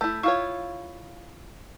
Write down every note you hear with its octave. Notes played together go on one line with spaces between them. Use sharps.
A3 E4 G6 B6
E4 F4 C#5 F5 C#6